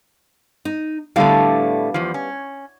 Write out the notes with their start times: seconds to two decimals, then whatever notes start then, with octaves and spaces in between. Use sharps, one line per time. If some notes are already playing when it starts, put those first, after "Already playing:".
0.65 D#4
1.16 A2 D3 G3 A3 B3 F5
1.94 E2 F3
2.14 C#4